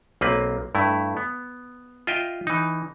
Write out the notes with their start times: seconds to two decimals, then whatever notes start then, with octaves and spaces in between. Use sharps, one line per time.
0.21 B1 A#3 C4 B4
0.75 G2 A3 E4
1.17 B3
2.07 F4 D#5 E5 G5
2.47 E3 D#4